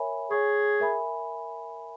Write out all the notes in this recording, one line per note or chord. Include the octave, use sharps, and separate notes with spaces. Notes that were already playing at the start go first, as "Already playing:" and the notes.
Already playing: A#4 C#5 E5 G#5 B5
G#4 C#5 G#5 C#6
A#4 E5 G#5 B5